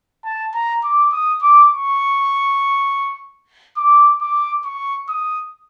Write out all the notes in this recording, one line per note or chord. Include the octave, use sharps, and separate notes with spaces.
A5
A#5
D6
D#6
D6
C#6
D6
D6
C#6
D#6